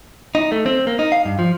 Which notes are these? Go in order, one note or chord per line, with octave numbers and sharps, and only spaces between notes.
D#4
A3
C4
A#3
D#4
F5
G2
F3